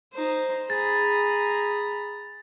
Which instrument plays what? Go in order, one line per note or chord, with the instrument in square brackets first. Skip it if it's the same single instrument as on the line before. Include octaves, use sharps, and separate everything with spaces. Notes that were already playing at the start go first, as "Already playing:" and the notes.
[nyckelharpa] D#4 C5
[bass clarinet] G#4 [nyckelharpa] A#5 B5 [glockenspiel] A6